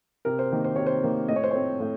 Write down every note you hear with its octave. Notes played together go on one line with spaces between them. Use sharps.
C3 A#4
C5
D#3 A#3
C5
C3 C#5
C5
D#3 A#3
A2 D#5
C#5
C5
A3 C4 C#5
A2